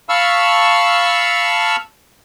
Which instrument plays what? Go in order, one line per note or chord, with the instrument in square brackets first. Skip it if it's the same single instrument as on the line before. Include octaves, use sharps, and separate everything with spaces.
[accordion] F5 A5 B5 C#6 E6 F6